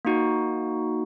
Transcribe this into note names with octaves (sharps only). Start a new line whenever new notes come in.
A#3 D#4 F#4